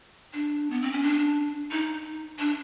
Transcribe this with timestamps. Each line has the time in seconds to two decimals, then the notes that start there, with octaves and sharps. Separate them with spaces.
0.33 D4
0.70 B3
0.82 C4
0.92 C#4
1.03 D4
1.71 D#4
2.39 D4